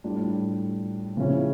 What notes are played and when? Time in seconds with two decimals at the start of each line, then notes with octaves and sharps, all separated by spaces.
0.04 A2 G3 D4 F4
1.17 C#3 F3 C#4 E4